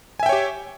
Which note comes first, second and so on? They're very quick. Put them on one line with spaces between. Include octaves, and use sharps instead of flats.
G#5 E5 G5 C#5 G4